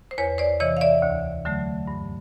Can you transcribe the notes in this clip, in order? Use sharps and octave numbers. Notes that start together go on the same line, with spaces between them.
C5
E2 B4 C#5
C5 D5
C3 E3 C#5 D#5
F5
D5 E5
D2
D3 F#3 A3
G2